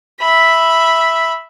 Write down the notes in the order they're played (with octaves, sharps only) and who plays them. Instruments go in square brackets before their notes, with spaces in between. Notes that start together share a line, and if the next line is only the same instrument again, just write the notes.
[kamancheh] E5 B5